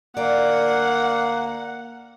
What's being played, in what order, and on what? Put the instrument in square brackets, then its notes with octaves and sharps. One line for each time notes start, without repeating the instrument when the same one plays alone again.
[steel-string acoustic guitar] D2 D5 [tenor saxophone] A#3 [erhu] F#5